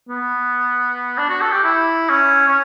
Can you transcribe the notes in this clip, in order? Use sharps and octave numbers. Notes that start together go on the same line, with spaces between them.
B3
D4
F#4
A4
G4
E4
C#4
C#4